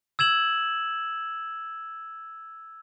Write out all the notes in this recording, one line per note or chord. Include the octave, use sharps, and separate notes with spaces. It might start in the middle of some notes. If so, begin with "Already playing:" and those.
E6 G#6 E7 F#7